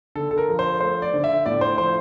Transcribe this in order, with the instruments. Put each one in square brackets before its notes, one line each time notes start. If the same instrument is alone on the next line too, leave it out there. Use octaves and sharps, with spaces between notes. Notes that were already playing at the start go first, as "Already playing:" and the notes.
[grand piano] D3 A4
A4
A#4
F3
C5
A3 C5
D5
D3
E5
A2 D5
C5
F3 C5